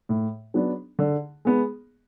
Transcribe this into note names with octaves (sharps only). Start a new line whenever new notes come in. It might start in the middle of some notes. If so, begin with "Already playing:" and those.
A2
F#3 B3 D4
D3
G#3 B3